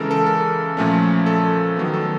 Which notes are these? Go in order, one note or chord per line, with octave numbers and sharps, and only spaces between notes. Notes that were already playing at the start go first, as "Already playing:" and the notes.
Already playing: C#3 E3 G#3 C#4 A4 A#4
A4
A4
A#2 F3 A3 C#4
A4
D#3 F#3 B3
A4